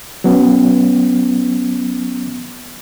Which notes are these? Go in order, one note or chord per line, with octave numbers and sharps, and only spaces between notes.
F#3 B3 C#4